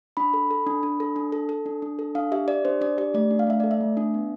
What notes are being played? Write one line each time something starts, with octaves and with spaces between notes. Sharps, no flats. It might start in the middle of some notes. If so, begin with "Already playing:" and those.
D4 B5
A4
A4
D4
D4
A4
D4
A4
A4
D4
D4
A4
D4 F5
G4 E5
G4 D5
D4 C5
D4 D5
G4 D5
A3 D5
D4
F5
A3 E5
A4 D5
E5
A3
D4
B3